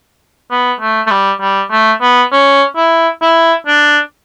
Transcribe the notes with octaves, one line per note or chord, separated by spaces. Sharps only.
B3
A3
A3
G3
G3
A3
B3
C#4
E4
E4
D4